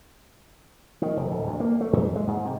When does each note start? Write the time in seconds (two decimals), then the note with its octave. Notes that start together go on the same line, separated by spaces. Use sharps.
1.02 D#3
1.17 F1
1.31 D1
1.47 D2
1.60 A#3
1.81 A3
1.93 F2
2.16 G#3
2.27 G#2
2.45 C3